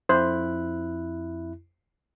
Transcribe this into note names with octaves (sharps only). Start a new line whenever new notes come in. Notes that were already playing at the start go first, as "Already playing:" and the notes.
F2 E4 C5 F#6